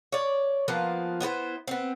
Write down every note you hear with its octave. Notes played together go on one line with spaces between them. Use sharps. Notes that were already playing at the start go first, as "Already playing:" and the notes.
C#5 D5
F3 A#3 B3
B3 E4 G4 C5
B3 C4